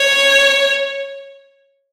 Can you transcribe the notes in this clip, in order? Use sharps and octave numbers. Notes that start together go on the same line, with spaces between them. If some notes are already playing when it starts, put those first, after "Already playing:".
Already playing: C#5